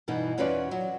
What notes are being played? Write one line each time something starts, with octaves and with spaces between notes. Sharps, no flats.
G2 B2 E3 D#4
E2 C#4 F4 F#4 B4 D5
F#3